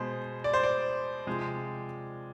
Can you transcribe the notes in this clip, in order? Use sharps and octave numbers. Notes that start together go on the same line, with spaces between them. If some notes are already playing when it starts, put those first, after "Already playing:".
Already playing: B2 G#3 C5
D5
C5
D5
C3 F3 G#3